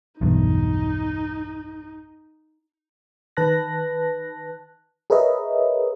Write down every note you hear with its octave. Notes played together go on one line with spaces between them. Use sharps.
B1 E2 G2 D#4
D#3 B4 A5 F#6 A#6
G#4 A#4 B4 C#5 D#5 E5